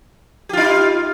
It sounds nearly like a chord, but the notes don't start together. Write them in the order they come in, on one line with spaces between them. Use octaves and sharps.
G4 F4 D#4